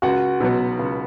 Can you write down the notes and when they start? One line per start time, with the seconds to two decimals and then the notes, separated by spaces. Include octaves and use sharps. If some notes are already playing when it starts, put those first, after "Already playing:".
0.02 C#2 F#4 F#5
0.40 B2 F#3 B3
0.79 C#2